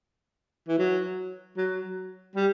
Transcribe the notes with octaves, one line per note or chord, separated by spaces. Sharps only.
E3
F#3
F#3
G3